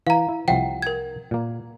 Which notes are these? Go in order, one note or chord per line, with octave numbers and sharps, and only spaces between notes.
E3 F5 A#5
E4
C2 F3 E5 F#5 G5
A#4 G#6
A#2 A#3